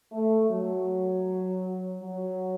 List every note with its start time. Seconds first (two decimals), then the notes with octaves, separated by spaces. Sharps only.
0.11 A3
0.50 F#3
2.01 F#3